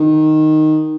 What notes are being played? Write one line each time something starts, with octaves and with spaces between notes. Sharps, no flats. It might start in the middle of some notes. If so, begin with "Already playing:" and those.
Already playing: D#3